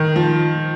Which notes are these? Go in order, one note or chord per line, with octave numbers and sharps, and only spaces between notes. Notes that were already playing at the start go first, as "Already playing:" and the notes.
Already playing: D#3
F3